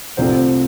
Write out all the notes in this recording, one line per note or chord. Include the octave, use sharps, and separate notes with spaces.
C2 C3 F3 A3 C4 C5